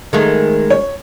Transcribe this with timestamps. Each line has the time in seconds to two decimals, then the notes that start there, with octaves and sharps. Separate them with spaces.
0.13 D#3 G#3 A3
0.70 C#5